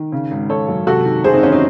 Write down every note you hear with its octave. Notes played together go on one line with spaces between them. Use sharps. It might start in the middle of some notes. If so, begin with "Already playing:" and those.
Already playing: D#3
C#3
G#1
G#1 A4 C#5
F#2
C3 F#4 A4
D#3
F#1 G#4 C5
C4 D#4
E2 C#4
C4 D#4